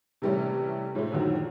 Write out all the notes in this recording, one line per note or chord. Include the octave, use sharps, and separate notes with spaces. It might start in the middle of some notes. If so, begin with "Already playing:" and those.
C3 E3 G3 A3 C#4
A2 F3 G#3 A3
F#2 A#2 D3 D#3 F3 F#3